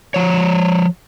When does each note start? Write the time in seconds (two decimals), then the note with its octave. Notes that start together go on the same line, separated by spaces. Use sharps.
0.14 F3 C#5